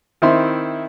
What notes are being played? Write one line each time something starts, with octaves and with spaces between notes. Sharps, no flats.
D#3 C4 E4 E5 C6